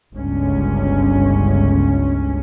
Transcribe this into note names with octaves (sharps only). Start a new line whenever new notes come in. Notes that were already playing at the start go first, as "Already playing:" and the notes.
G1 C#2 C#4